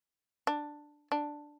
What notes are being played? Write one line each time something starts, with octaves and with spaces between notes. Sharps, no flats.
D4
D4